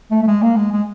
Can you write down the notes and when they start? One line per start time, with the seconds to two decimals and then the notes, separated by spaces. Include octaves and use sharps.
0.11 A3
0.22 A3
0.27 G#3
0.42 A#3
0.57 G#3
0.72 G#3